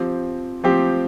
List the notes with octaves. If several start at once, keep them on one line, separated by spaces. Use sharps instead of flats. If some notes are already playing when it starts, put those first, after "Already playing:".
Already playing: F3 C4 G4
F3 C4 G4